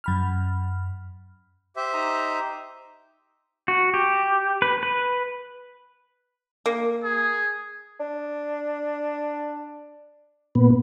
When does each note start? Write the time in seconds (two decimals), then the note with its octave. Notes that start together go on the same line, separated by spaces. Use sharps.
0.04 F#2 B5 F6
1.76 G4 C5 E5
1.94 D#4 A#5 D#6
3.68 F#4
3.94 G4
4.62 B4
4.83 B4
6.66 A#3
7.04 G#4
8.00 D4
10.55 A#2 B3